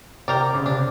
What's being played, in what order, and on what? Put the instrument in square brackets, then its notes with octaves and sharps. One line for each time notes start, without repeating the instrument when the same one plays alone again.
[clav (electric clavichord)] C3 [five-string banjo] G4 A#4 D5
[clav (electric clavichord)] C#3
[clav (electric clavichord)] C3 [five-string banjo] D4